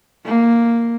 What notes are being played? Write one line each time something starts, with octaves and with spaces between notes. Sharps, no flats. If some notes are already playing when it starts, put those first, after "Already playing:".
A#3